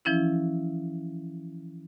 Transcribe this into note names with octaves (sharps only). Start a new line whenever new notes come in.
E3 F3 C#4 E4